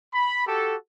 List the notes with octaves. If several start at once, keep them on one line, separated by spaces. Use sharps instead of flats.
B5
F#4 G4 A4